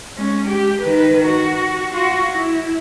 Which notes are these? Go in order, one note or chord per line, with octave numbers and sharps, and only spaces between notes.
G#3 C#4
G4
D#3 B4
F#4
F4 F#4
E4